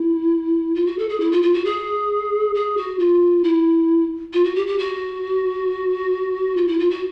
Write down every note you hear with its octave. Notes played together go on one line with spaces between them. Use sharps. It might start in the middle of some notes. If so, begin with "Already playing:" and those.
Already playing: E4
F4
F#4
A4
G#4
E4
F4
F4
F#4
G#4
G#4
F#4
F4
E4
F4
F#4
G4
G4
F#4
F4
E4
F4
F#4